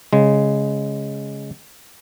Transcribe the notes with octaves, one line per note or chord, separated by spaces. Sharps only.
C#3 G#3